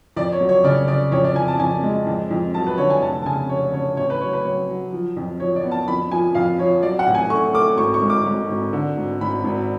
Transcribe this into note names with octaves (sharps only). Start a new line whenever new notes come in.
F2 D5
C#5
F#3
C#5
C#3 D5
C#3 D5
F2 C#5
D5
F2 G#5
A5
F2 G#5
G#3
F2
F2
F#3 A5
B4
D3 C#5
G#5
F1 A5
A5
C#3 G#5
F1 C#5
C#3 C#5
A1 C#5
B4
F#3 C#5
B4
F#3 C#5
F#3
F3
F2
F3 C#5
D5
B3
A5
F2 B5
F3 G#5
F2 F5
F3 C#5
F#3 D5
F#5
A1
G#5
A3 C#6
A3 D6
G#1 C#6
C#6
G#2
D6
G#2
G#1
D3
G#1
G#1 B5
G#1